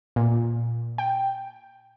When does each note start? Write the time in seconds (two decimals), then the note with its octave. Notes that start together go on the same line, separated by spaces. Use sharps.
0.16 A#2
0.98 G5